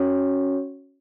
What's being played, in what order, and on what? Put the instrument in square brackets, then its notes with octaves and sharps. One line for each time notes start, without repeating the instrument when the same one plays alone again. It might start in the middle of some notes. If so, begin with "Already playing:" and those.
Already playing: [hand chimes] C#4 F#4 C#5